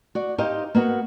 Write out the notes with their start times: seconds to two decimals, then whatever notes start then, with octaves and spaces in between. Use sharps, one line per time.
0.15 F#4 D5
0.38 D#4 G4 C5 D#5 F5
0.75 A#3 B3 F#4